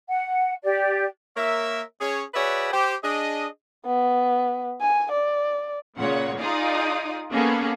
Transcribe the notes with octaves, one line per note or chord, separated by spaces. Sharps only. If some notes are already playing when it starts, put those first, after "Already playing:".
F#5
G4 D5
A#3 A#4 C#5 E5
C#4 G#4 C#5
F#4 G#4 B4 C#5 D5 E5
G4 C5
D4 G#4 D#5
B3
G#5
D5
A#2 C#3 C#5 F#5
D#4 F4 G#4 D5 F5 D#6
A#3 B3 C#4 G#4 A4